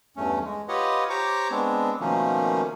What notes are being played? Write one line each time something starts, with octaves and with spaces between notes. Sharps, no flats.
E2 G2 A3 C#4
G#3
F4 G4 B4 C#5 D#5 F#5
G4 C5 C#5 A#5 C#6 D6
G#3 B3 C4 D4
B2 D#3 F3 A3 A#3 C#4